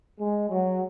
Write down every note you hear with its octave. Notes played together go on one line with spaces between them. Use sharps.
G#3
F#3